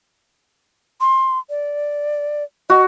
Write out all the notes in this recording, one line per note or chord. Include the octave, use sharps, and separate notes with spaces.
C6
D5
F#4 D#5